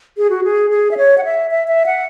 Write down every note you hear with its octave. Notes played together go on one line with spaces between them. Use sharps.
G#4
F#4
G#4
G#4
E5
C#5
F#5
E5
E5
E5
F#5